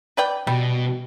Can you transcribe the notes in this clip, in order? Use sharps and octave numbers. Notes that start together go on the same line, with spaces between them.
B4 D5 G5
B2 G3